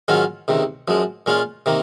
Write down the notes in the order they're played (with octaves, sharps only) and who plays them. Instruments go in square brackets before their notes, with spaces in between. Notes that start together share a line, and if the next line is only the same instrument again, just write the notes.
[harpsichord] G#2 D#3 F#3 C#4 F4
C#2 C3 D#3
F#2 F3 G#3
A#2 G#3 C#4 F4
C3 D#3 A#3